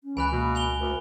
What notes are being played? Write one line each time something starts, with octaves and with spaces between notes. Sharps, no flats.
C#4
C#2 E3 G#5 B5 F#6
B2 A#3
G#5 F7 G7
D2 A#4